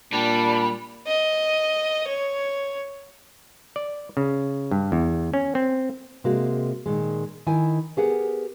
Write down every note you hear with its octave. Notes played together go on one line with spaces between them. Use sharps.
A#2 G3 D4
D#5
C#5
D5
C#3
G2
E2
C#4
C4
C3 G#3 A#3 F#4
A#2 D#3 G#3
D#3 E4 G#5
B3 G4 G#4 A#4 F#5